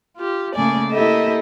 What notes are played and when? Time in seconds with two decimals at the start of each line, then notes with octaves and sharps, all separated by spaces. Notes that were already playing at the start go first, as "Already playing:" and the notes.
0.17 F4 G4
0.55 C#3 A3 A#3 D5 G#5
0.90 A#3 E4 G4 A4 D#5 E5